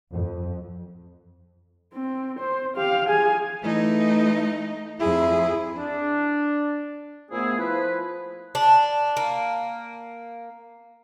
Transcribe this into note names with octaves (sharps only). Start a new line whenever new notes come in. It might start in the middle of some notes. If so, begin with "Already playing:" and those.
F2
C4
C5
G4 F5
G#4 G#5
E3 A3 D#4
F2 E4 G#4
D4
A#2 F3 A3 B3 E4 G#4
F3 E4 B4
D4
A#3